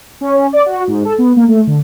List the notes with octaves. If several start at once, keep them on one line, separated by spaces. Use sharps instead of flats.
C#4
C#4
D5
F#4
G#2
A4
B3
A#3
A3
D3